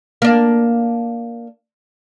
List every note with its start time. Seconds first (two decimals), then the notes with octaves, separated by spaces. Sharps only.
0.22 A#3 D4